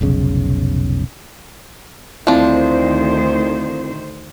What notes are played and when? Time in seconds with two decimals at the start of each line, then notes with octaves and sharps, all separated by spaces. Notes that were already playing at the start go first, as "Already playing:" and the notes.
0.01 F1 B1 C#3
2.27 D2 D#3 F3 C4 D4 E4 C5